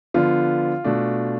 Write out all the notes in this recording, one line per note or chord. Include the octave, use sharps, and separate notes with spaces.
D3 F3 B3 F4
B2 A3 D4